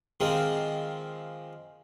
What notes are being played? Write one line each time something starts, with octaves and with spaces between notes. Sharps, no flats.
D#3 F3 G#3 A#3 C4